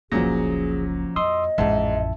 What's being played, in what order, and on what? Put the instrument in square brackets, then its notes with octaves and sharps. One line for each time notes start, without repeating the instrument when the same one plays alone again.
[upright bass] F#1 C#2 [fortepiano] A#2 F#3 [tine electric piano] F3 C#4 A#6 [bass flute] G#4
[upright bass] F2 [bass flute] D#5 [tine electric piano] C6 D#6 E6
[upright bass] A1 F2 [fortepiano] G#2 [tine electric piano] E5 A5